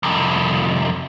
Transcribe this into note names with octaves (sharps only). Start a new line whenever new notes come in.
C2 F2